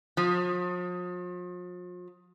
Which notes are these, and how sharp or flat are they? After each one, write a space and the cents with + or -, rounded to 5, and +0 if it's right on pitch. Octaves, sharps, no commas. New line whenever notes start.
F3 +40